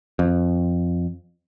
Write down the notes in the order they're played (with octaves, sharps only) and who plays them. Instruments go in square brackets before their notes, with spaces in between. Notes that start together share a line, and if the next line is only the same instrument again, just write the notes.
[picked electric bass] F2